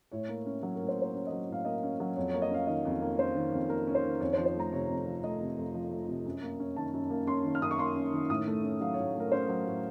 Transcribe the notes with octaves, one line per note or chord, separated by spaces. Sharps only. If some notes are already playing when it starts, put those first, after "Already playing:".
A2 C#5
A#3
C#4
F#3
A2 A#4
C5
A#3
C5
C#4 C#5
D#5
F#3
A2 F5
A#3 D#5
C#4
F#3
F2 C#5
A#3 C#5
D#5
C#4 F5
D#3 D#5
F2
A#3
C#4 C5
D#3
F2
A#3 A#4
C#4
C5
D#3
F2 C#5
C5
F3
C5
A3 A#5
C3 C#5
F2
F3
A3 D#5
C3
F2
F3
A3
C3
F#2
A#3
C#4
D#3 A5
F#2
A#3
C#4 C6
D#3
F6
F#2 D#6
C#6
A#3 C6
C#4
D#3
A2 D#6
A3
C#4
F#3 F5
A2 C#5
A3
A#4
C#4 C5
F#3
A2